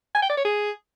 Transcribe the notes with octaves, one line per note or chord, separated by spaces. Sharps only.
G#5
G5
D5
C#5
G#4